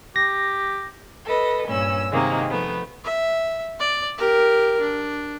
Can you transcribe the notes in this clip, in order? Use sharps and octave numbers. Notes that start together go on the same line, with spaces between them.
G4 A#6
A4 B4 D#5
G2 A#2 C#4 E6
C3 D#3 G#3 A#3
F3 A3 B3
E5
D5
G4 A#4
D4